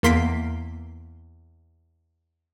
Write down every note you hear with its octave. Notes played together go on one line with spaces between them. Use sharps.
E2 A#3 C6 B6 C7 D7